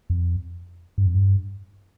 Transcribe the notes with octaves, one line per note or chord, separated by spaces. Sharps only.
F2
G2
F2
G2